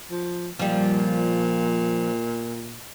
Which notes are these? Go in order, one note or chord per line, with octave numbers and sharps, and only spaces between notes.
F3
A#2 F3 G3